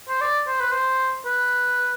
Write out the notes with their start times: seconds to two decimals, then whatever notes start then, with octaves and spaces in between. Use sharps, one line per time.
0.09 C5
0.21 D5
0.47 C5
0.60 B4
0.72 C5
1.25 B4